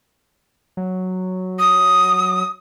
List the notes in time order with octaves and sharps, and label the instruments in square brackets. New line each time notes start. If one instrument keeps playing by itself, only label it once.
[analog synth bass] F#3
[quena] D#6